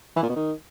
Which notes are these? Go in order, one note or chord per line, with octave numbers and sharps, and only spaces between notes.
E3
A#2
B2
D#3